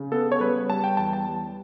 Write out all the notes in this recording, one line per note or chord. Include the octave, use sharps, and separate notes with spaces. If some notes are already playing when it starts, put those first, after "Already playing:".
Already playing: C#3
B3 A4
C#5
G3 B4
G3 A5
G5
E2 A5
A5
G3